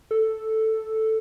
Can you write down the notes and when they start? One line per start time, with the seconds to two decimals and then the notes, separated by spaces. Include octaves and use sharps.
0.11 A4